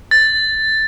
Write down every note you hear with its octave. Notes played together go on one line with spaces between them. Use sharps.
A6